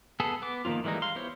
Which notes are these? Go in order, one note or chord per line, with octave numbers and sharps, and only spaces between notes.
B3 G#4 A4
B3 D6
D#3 F3 A#3 C4 F4
E3 G3 G#3 A#3 D#4
F5 C6
B3 E4 G4 C5 C#5